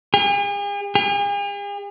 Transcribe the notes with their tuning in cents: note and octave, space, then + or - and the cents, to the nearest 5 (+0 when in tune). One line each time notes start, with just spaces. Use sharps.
G#4 -45
G#4 -45